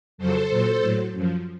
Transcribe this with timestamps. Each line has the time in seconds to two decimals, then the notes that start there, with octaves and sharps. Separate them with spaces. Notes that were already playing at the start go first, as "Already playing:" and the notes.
0.18 F2 C#3 F#3 A4 C5
0.50 A#2 F#3
0.81 A2 F#3
1.13 F#2 F3